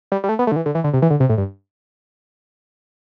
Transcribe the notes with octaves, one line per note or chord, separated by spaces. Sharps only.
G3
G3
A3
B3
A3
D3
E3
D3
E3
D3
C3
E3
D3
C3
A2
G2